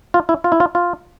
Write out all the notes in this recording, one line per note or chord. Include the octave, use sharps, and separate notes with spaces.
F4
E4
F4
E4
F4
F4